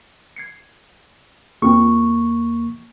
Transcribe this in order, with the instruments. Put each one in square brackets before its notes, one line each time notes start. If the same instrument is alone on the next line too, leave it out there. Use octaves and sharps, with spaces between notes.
[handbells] G#6 C7 C#7
[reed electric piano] E2 A#3 C#6 [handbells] C4 F4 G#4